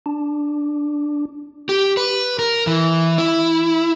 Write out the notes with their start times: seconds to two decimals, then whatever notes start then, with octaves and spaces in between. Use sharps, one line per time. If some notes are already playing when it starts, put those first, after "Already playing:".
0.06 D4
1.69 G4
1.97 B4
2.39 A#4
2.67 E3
3.18 E4